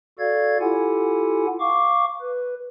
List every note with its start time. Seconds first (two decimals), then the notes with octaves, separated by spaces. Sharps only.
0.19 F#4 A4 D5 F5 G#6
0.61 E4 F4 G4 A4 F#5 G#5
1.60 F5 C#6 D6
2.21 B4